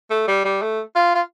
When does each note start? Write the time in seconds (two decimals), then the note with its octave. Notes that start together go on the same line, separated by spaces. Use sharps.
0.10 A3
0.28 G3
0.45 G3
0.62 A3
0.95 F4
1.15 F4